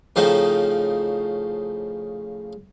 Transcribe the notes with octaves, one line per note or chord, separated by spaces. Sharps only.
A2 C#3 F3 A3 C4 D#4